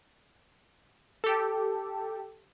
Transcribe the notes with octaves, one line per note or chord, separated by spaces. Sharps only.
G4 A4